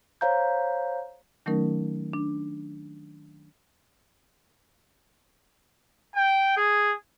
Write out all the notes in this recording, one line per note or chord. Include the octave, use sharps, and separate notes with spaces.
C5 C#5 F5 A#5 G6
D#3 F#3 A3 C#4 D#4 A#4
D4
G5
G#4